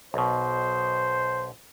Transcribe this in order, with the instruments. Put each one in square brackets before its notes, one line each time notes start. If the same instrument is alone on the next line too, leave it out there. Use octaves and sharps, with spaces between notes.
[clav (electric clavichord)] B1 B2 [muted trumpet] C5